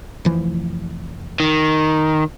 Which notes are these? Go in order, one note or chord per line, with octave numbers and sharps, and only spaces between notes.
F1 E3 F3
D#3